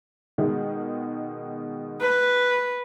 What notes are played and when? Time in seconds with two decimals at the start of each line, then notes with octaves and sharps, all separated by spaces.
0.38 B2 D#3 G#3
2.01 B4